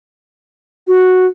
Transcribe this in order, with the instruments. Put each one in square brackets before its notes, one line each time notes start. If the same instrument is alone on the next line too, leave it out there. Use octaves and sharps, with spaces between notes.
[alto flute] F#4